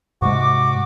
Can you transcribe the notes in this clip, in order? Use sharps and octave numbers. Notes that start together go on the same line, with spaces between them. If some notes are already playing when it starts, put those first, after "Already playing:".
G#2 C3 G#3 F#4 D6